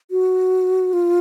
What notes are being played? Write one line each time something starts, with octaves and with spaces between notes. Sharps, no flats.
F#4
F4